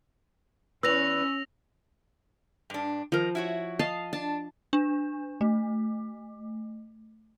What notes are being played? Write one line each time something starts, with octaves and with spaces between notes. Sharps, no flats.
E2 C#4 B4 E6 A#6 F7
G2 D4
D#3 F3 A#4
E4 F#4 C#5
D#5 F5 A5
D4 A5
D4
A3